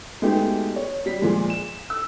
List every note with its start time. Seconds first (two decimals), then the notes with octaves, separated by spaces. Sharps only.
0.22 G#3 A3 B3 D#4 F#4 G4
0.76 C#5
1.06 G3 B6
1.22 A#2 F3 G#3
1.50 E7
1.90 E6